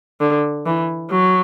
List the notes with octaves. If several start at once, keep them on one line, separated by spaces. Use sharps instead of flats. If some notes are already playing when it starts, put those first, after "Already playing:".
D3
E3
F#3